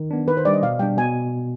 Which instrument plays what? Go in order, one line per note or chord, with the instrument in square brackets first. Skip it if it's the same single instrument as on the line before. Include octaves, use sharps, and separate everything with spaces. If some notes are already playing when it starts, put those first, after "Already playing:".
Already playing: [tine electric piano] D#3
B3 D4
[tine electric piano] D#3 [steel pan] B4
[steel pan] C5
[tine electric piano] G3 D4 [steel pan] D5
[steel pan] D#5
[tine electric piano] B2 [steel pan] F5
[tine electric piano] G3 D4 [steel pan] G5
[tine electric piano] B2 [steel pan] G#5